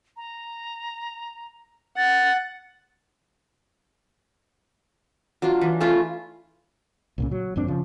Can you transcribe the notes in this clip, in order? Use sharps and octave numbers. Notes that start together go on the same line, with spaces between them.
A#5
F#5 A6
F#3 D4 F4
E3
A3 C#4 E4 F4
C2 A#2 C#3
F#3
A1 F#2 C4 D4
C#3 F3